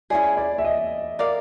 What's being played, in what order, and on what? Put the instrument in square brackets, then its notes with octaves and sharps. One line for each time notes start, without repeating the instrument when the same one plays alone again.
[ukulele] C#4 E4 G#4 [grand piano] D5
[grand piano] D5
E5
D#5
[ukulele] A#4 D5 F5